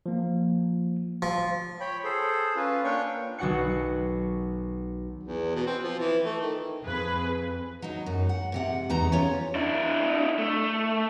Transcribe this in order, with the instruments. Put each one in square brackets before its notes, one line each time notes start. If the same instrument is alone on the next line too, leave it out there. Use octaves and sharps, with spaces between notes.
[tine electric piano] F3 A#3
[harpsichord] F3
[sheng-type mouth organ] C#5 G5 B5
G#4 A4 C5
C#4 F4 B4
A#3 D4 C#5 G5 C#6
[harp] B1 D#3 F#4 F#5 F#6 C#7
[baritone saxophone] E2
B2
C4
F3
E3
A3
D#3
[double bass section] F2 C4 [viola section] G#4 B4
[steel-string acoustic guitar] F#3 D#4
F#2
F#5
G#2 C3 F#5
E2 D#4 A#5
C#4 F4 C#5
[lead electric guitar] D4 E4
A3